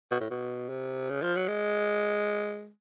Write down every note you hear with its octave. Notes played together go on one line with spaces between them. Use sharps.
B2
A2
B2
C3
C#3
F3
F#3
G#3